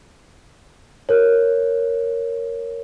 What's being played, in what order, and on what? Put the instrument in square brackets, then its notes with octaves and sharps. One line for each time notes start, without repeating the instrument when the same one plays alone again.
[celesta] A#4 C#5